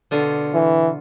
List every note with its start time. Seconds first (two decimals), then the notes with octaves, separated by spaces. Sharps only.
0.11 B2 D3 F4
0.54 E3